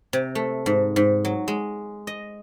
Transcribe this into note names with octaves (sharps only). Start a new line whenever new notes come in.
C3
A3
G#2
G#2
F#3
G#3
D#5